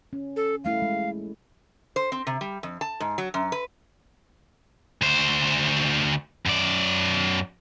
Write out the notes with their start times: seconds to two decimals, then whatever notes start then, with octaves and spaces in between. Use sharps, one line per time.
0.13 C#4
0.36 A4
0.65 G3 A3 E4 F5
0.82 G#3
1.96 C5
2.12 C4
2.27 C3
2.41 G3
2.63 F2
2.81 A5
3.00 G#2
3.18 F#3
3.34 F#2
3.52 B4
5.02 D2 C5
6.46 F#2 D5